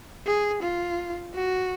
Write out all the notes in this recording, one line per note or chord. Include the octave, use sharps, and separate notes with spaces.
G#4
F4
F#4